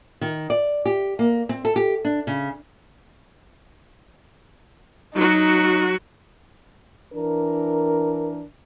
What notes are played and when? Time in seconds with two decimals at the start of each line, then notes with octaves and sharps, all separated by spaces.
0.21 D#3
0.50 D5
0.85 G4
1.19 A#3
1.49 C4
1.65 A4
1.76 G4
2.05 D4
2.27 C#3
5.15 F#3 D#4 F#4
7.14 E3 D4 A#4